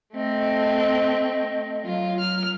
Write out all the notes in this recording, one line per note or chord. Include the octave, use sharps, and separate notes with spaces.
A3 C4 D#5
F#3 F4
F6